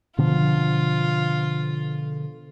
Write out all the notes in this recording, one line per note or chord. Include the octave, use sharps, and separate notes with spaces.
B2 D3 F3 F4